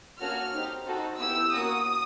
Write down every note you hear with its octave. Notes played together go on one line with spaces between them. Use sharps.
A#3 C#4 F#4 A4 F6
C4 D#4 G4
C4 D#4 F#4 A4
B3 E4 G4 E6
A#3 C#4 F#4 D#6